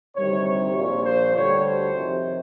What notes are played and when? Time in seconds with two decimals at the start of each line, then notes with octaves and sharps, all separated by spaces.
0.16 D2 C3 D#3 G3 C#5
0.46 C#5
0.75 A#1 A#2 F3 C#5
1.05 C5
1.34 D2 D3 G3 C#5
1.64 C5
1.94 F2 C3 D#3